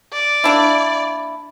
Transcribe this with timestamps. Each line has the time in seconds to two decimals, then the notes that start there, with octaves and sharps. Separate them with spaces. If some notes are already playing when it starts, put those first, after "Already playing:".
0.13 D5
0.44 A#3 D4 E4